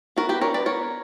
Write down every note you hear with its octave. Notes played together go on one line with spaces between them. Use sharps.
B3 F#4 A#4
G4 B4
D4 A#4 C#5
B4 D5
B3 A#4 C#5